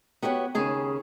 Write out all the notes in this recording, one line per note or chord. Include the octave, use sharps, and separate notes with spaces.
B3 F#4 G4 A#4 C#5
D#2 C#3 G#4 G#5